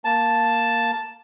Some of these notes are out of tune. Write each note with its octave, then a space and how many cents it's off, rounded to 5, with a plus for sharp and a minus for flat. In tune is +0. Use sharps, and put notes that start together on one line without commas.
A#3 +0 A5 +0